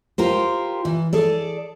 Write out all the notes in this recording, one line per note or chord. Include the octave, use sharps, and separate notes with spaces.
F4 G4 A#4 C5
E3
G#4 A4 D5